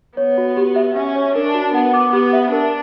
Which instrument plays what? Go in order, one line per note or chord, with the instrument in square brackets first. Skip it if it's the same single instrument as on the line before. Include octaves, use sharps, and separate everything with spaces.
[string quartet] B3 [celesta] C#5
[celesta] F#4
G4
E5
[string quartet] C#4 [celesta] E5
[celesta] C#5
[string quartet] D4 [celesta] A#4
[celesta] F#4
[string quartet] B3 [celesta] F#5
[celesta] D6
[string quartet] B3 [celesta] G4
[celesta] E5
[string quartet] D4 [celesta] A#4